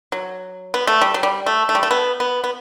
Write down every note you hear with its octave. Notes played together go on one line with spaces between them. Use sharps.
F#3
B3
A3
G3
F#3
G3
A3
A3
G3
A3
B3
B3
B3